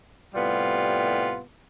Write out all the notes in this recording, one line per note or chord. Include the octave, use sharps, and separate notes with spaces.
A2 C3 G3 B3 F4